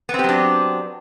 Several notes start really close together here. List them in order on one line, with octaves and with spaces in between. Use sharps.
B3 C4 G4 F#3 D4